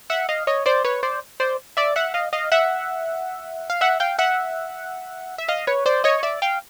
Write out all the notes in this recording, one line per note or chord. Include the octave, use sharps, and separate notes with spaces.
E5 F#5
D#5 F5
C#5 D#5
C5 D5
B4 C#5
C5 D5
C5 D5
D5 E5
E5 F#5
D#5 F5
D#5 F5
E5 F#5
F5
E5 F#5
F5 G5
E5 F#5
E5
D#5 F5
B4 C#5
C5 D5
C#5 D#5
D5 E5
F5 G5